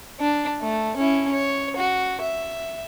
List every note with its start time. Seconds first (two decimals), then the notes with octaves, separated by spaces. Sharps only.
0.21 D4
0.61 A3
0.97 C#4 E4
1.32 C#5
1.76 F#4
2.22 E5